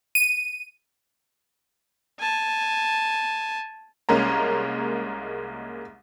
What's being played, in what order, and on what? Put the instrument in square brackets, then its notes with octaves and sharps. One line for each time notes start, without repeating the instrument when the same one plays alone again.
[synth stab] D#7
[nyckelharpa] G#5 A5
[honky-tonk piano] C2 G#3 A#3 C#4 A#5